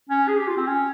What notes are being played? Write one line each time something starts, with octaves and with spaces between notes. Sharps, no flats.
C#4
G#4
G4
F4
C4
C#4